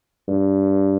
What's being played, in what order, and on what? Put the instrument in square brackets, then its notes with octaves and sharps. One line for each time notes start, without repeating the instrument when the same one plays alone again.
[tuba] G2